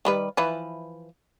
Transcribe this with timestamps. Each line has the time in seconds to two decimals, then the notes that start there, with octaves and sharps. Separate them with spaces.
0.05 D#3 G3 B4
0.37 E3 F3 B4